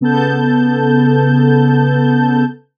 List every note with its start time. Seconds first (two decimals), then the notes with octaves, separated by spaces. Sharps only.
0.01 C#3 B3 A4 A5 G6